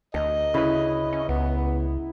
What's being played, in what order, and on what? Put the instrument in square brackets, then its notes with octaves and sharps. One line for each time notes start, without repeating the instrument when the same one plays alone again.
[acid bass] D2 [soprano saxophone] D#5 [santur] A#5
[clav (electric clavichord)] C#3 B4 [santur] E4
[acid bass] C#4
[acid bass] C#2 [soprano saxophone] B3